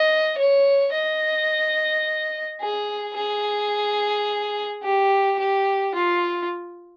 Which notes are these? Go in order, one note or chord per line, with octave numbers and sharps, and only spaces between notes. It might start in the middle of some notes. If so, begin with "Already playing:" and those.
Already playing: D#5
C#5
D#5
G#4
G#4
G4
G4
F4